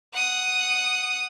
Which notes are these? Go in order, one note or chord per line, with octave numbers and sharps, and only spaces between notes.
F#5 D#6